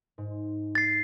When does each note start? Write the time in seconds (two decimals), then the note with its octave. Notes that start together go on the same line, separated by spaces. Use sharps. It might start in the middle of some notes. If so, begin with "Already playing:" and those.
0.18 G#2
0.75 A6 C7